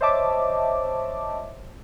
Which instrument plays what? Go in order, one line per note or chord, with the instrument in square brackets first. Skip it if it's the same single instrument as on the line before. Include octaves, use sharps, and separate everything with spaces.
[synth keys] C5 C#5 D#5 E5 A5 D6